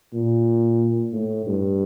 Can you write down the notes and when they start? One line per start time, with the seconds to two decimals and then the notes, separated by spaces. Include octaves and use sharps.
0.14 A#2
1.13 A2
1.46 G2